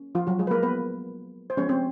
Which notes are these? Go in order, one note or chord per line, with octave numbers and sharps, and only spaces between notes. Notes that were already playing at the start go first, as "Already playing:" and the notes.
Already playing: A#3 C#4
F3 F4
F#3 F#4
G#3 G#4
B4
A#3 A#4
B3 B4
C5
F3 G#3 B3 C#4 C#5
C4 C5